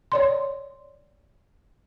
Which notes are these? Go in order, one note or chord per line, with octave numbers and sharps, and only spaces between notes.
C#5 D5 C6